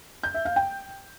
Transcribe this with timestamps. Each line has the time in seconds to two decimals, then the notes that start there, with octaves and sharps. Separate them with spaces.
0.23 G6
0.34 E5
0.45 F5
0.56 G5